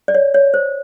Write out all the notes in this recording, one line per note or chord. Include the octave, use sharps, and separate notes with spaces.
D5
C#5
C#5
C5